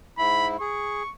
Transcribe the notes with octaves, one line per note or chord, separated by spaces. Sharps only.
G#2 E4 B5
G#4 C#6